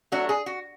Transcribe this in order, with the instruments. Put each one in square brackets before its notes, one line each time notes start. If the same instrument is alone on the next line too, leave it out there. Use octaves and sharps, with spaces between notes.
[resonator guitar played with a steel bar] F#3 A3 D4 F#4
G#4
F#4